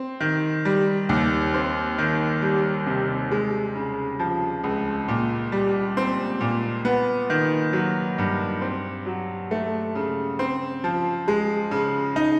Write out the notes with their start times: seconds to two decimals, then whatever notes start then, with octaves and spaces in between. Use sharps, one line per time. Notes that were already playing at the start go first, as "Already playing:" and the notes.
Already playing: C4
0.20 D#3
0.65 G3
1.09 D#2
1.54 C4
1.98 D#3
2.42 G3
2.86 C3
3.31 G#3
3.76 C#3
4.20 F3
4.64 C#2
5.08 A#2
5.52 G3
5.97 C4
6.41 A#2
6.85 B3
7.30 D#3
7.73 F#3
8.18 G2
8.61 C4
9.06 F#3
9.51 A3
9.95 C#3
10.39 C4
10.84 F3
11.28 G#3
11.71 C#3
12.16 D#4